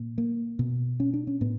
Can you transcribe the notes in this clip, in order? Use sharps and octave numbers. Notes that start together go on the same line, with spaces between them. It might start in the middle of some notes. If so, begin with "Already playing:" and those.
Already playing: A#2
A#3
B2
C#4
D4
C#4
A2 B3